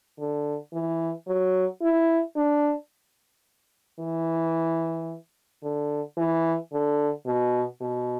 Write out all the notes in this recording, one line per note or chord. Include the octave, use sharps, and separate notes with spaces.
D3
E3
F#3
E4
D4
E3
D3
E3
D3
B2
B2